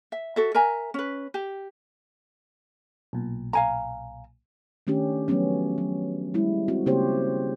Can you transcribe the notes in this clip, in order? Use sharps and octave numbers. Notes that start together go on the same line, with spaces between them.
E5
F#4 A4 E5
A#4 E5 G#5 A#5
C#4 B4
G4
B1 A#2
F5 G#5 A#5
D#3 A3 C#4 D4 G4
F3 F#3 A3 B3 C#4
F#3
G3 G#3 E4
C4 F#4
C#3 A#3 C4 G4 C5 C#5